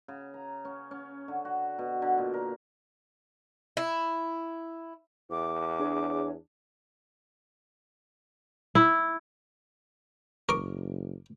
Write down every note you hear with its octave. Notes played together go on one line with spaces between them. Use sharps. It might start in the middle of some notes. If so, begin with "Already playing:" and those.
C#3
A#5
C#4
C#4
D3
F#4
B2
D3
A#2
A#4
E4
E2 D6
D4 G#4 C#5
E4
F#1 A#4 C#6 D6